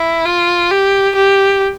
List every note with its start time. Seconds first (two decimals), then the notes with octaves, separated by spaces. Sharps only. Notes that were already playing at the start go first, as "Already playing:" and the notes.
Already playing: E4
0.25 F4
0.71 G4
1.15 G4